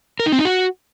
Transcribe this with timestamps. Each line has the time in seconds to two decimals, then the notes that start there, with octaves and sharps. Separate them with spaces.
0.20 A#4
0.26 D#4
0.32 C4
0.39 D#4
0.45 F#4